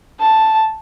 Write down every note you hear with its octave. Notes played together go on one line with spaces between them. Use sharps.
A5